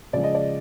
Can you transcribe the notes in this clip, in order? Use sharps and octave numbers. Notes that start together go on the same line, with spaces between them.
C#3 F3 G#3 D5
D#5
D5